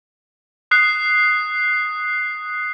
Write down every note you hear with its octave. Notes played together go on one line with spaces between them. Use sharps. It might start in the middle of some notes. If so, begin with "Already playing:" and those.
D#6 F#6 C7